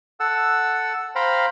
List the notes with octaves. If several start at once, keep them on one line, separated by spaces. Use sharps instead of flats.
A4 F#5 E6
C5 F5 G5 A#5 B5